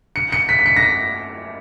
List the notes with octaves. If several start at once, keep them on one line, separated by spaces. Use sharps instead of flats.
C#7
C#7
B6
B6
C#7
A#6
B6